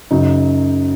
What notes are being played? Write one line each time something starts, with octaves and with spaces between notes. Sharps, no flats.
F#2 C#3 F#3 D#4